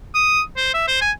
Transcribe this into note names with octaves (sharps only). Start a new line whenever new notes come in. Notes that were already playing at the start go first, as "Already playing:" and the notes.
D#6
C5
E5
C5
G#5